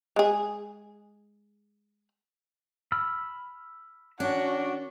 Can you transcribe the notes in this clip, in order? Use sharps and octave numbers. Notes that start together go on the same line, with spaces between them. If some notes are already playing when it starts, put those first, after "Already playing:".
G#3 G#4
B5 E6 F6
D#3 C#4 D4 F#4